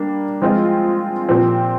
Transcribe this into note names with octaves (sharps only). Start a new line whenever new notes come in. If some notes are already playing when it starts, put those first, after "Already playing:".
Already playing: G3 A#3 D4
F3 G#3 C4 F4
A#2 F3 C4 G4